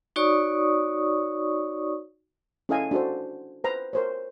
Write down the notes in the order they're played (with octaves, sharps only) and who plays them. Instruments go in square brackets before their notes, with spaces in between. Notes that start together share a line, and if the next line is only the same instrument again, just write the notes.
[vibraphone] D#4 F#4 C#5 D5 C#6 D#6
[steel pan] C#4 E4 A4 D#5 F5 G#5
D4 F#4 A4 C5
B4 C5 A#5
A#4 C5 C#5